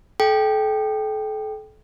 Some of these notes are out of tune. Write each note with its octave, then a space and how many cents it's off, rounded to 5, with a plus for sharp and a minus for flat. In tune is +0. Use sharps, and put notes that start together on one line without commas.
A4 -35 G5 +0